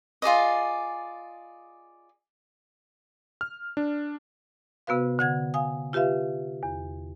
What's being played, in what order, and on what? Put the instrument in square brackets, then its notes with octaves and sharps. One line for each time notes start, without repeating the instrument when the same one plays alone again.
[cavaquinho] F4 G#4 D5 D#5
[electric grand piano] F6
D4
[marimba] C3 B3 F#4 B4 F5
D3 F#5 G#6
F5 G#5 D#6
F4 G4 B4 E5 F5
E2